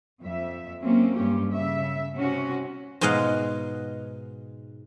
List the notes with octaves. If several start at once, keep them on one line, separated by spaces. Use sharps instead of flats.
F2 E5
F#3 A#3 C4 C#4
G2 C#4 G4
C#3 E5
C3 C#4 F#4
G#2 B2 G#3 D#5 F5 F#5